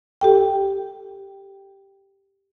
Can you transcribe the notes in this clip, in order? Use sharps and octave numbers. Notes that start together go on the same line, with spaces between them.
G4 A4 G5